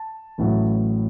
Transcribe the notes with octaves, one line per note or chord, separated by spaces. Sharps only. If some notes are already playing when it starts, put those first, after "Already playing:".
Already playing: A5
A1 A2 F#3